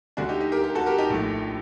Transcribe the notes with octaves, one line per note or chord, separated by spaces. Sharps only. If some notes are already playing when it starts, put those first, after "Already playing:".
D2 D3 A3 D4 F#4
D#4 G4
D#4 G4
G4 A#4
G4 A#4
F#4 A4
G4 A#4
D#4 G4
A#1 A2 A3